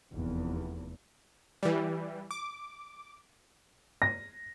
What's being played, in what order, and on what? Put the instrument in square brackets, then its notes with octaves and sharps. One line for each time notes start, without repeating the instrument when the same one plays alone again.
[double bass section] F1 E2
[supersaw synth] E3 G3
D6
[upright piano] A#6